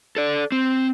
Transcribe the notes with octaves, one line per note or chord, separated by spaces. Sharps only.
A4 D5
C4